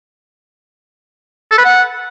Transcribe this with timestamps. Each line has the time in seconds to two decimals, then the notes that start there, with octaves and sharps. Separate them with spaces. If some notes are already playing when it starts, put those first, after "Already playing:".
1.51 A4
1.58 B4
1.64 F#5